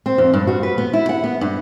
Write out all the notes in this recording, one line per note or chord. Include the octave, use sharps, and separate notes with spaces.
C4
F2
G2
F#4
B4
B3
E4
F#5
B3
G2